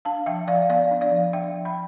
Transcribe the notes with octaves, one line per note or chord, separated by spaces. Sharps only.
D4 F5 A5
F3 E5 G5
F3 D5 F5
B3 D5 F5
D4
D5 F5
F3
D4 E5 G5
F3
G5 B5